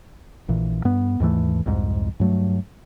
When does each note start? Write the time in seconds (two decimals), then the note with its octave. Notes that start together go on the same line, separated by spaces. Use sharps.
0.48 A#1 A#2 E3
0.85 G2 B3
1.20 D#2 G#2 E3 A3
1.66 C2 F2 G#2
2.20 G2 F#3 A3